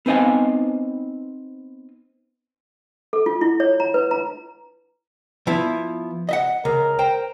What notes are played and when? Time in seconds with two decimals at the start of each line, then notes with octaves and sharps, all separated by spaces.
0.06 B3 C4 D#4 D#5 F5 G#5
3.13 A4
3.26 F4
3.41 E4
3.60 C#5
3.80 A#5
3.94 B4
4.11 A#5
5.47 F3 B3 E4
6.29 D#5 E5 F#5
6.65 C#2 A#4
6.99 C5 G5 A#5